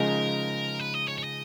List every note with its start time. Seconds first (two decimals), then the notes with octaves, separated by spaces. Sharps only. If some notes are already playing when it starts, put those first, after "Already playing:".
Already playing: C#3 F3 G#3 D#4 A#4
0.79 B4
0.94 D#5
1.08 C#5
1.18 C#5
1.24 D#5